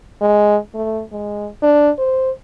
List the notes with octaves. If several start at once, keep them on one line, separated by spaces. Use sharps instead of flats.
G#3
A3
G#3
D4
C5